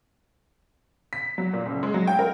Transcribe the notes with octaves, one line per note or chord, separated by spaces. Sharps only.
B6
F#3
A#2
F#1
G#3
F#3
G5
A#4